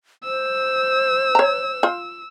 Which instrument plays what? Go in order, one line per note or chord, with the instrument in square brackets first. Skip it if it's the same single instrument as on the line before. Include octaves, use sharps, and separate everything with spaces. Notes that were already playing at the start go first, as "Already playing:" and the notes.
[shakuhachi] C5 [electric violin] E6
[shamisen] C#5 A#5
F4 C5